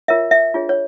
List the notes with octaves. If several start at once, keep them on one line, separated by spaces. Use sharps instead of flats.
F4 A#4 C#5 E5
E5
D4 F4 G#4 C#5
C#5